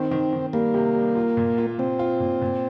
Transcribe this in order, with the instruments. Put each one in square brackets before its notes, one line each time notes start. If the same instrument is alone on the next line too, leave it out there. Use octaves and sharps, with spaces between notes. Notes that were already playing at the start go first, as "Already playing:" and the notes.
Already playing: [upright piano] D#3 [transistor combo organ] C4
[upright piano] D#3
D#3
[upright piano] G3 [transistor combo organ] A#3
[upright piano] C3
G3
F4
A#2
F4
[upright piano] A#2 [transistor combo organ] C4
[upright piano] F4
A#2
A#2